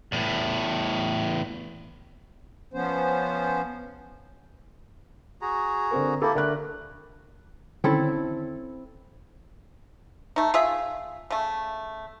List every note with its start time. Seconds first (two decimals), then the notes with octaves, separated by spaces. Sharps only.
0.12 E2 A2
2.74 F3 B3 C#4 C5
5.41 F#4 G#4 A#5
5.91 D3 C4 A#4
6.22 A#3 E4 G4 A4
6.35 D3 A3 A#4 F#6
7.84 D3 D#3 C4 C#4 E4 A4
10.36 A3 D#4
10.54 F4 G#4 E5
11.31 C#3 A3